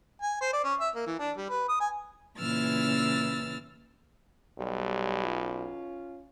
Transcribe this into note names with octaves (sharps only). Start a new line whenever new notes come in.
G#5
C5
D5
C#4
E5
A#3
E3
D4
G3
B4
D#6
G#5
A#2 C#3 E3 E6 F6 A6
B1 G3
C#4 F4